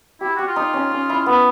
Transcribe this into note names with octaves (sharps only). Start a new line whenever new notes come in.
E4 G4
F#4 G4
F4
D#4
C#4
C#4
E4
B3